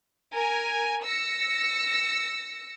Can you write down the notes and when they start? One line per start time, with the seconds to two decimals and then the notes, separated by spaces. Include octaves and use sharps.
0.32 A#4 G#5
1.04 E6 A#6 C#7